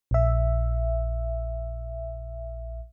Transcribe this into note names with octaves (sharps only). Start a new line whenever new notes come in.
A#1 E5